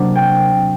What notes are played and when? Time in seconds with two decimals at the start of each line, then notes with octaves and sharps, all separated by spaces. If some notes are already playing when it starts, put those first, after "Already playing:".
Already playing: C3 F#3 A#3 D4
0.15 G5